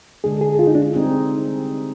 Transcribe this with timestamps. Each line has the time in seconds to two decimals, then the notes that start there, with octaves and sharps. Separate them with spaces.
0.24 D3 G#3 D4 G#4
0.41 G#4
0.59 F4
0.67 D#4
0.75 D4
0.93 G3 C4 D#4 G#4